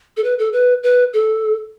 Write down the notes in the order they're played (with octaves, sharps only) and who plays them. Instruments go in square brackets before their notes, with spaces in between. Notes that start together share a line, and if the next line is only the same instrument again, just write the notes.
[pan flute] A4
B4
A4
B4
B4
A4